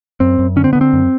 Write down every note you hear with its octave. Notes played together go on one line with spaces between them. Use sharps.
F#2 C4
F#2
D3 C#4
C4
D3 B3
C4
F#2